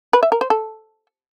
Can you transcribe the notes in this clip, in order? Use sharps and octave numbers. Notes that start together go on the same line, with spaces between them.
B4
E5
A#4
C5
A4